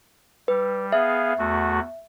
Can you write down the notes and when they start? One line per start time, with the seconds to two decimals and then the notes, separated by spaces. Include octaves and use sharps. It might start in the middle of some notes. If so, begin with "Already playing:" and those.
0.48 G3 B4
0.92 B3 G#4 E5 F5
1.38 E2 A3 F#4